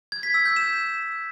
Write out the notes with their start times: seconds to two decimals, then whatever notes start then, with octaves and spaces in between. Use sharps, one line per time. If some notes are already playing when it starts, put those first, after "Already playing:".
0.12 G#6
0.23 B6
0.34 E6
0.45 G6
0.56 E7